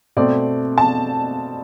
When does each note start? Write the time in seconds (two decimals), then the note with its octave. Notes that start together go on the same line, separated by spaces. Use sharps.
0.17 B2 A3 C4 D5
0.78 A5